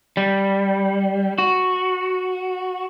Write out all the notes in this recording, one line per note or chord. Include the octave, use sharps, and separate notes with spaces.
G3
F#4